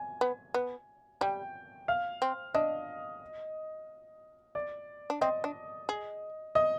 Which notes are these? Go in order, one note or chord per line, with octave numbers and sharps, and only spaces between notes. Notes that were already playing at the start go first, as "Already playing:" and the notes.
Already playing: G#5
B3
B3
G3 G5
F5
C4
D4 D#5
D5
D4
C4 D#5
D4
G#4
D#5